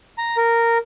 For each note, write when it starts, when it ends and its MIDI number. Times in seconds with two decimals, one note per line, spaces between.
0.18 0.37 82
0.37 0.78 70